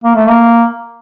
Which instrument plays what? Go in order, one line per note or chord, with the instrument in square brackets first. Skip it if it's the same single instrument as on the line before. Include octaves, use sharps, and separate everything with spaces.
[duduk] A#3
A3
A#3